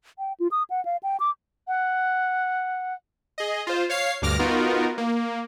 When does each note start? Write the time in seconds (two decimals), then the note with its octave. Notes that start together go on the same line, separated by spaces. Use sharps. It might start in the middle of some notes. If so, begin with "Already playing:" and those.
0.19 G5
0.40 F4
0.51 D#6
0.70 F#5
0.85 F5
1.03 G5
1.20 D6
1.67 F#5
3.38 G#4 D#5
3.67 F4 C5
3.89 C#5 F5 C7
4.22 D2 G2 D6 F6 A#6
4.39 B3 D#4 F4 F#4 A#4
4.98 A#3